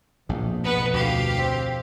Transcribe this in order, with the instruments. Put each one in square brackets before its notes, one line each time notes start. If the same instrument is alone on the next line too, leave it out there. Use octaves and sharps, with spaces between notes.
[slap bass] A#1 G#2 [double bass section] F2 B2
[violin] B3 B4
[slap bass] D2 [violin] G4 F5
[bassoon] C4